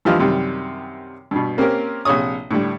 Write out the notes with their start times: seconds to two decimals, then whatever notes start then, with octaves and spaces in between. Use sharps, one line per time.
0.05 G2 E3 F3 G4 D#5 F5
0.19 F#2 C3 D#3 G3
1.31 G2 B2
1.58 A#3 C4 C#4 G4 A#4
2.05 A#1 C3 G#4 C#5 D#6
2.51 A2 D3 G3